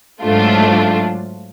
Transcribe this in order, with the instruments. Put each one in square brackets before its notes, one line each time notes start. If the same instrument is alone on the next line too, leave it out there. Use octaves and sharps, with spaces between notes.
[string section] G#2 F#3 A3 D4 F4